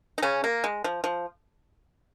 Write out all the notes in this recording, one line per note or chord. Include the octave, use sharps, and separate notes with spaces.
D#4
C#3 C#4
A#3
G#3
F3
F3